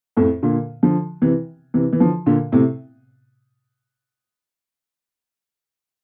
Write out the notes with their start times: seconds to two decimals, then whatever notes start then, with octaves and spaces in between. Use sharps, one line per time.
0.17 F2 A2
0.43 A#2 D3
0.83 D3 F3
1.22 C3 E3
1.74 C3 E3
1.93 E3
2.00 D3 F3
2.26 A#2 D3
2.52 A2 C3